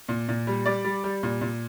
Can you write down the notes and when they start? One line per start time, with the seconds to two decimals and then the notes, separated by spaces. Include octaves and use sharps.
0.09 A#2
0.28 A#2
0.47 G3
0.65 G3 D5
0.84 G3
1.04 G3
1.23 A#2
1.41 A#2